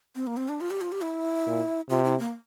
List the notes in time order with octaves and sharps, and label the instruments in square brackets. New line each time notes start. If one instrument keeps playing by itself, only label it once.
[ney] C4
A#3
C4
D4
F4
G4
F4
G4
E4
[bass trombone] A#2
[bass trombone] C3 [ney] F4
[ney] E4
A#3